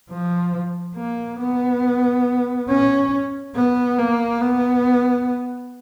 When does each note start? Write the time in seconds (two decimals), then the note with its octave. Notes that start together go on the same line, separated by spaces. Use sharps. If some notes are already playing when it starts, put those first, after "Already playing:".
0.11 F3
0.96 A#3
1.40 B3
2.69 C#4
3.55 B3
3.99 A#3
4.41 B3